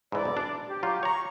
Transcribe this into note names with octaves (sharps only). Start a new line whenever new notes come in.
G#2 E3 D5
B1
D4
G4
F#3 F4
C#5 A#5 C#6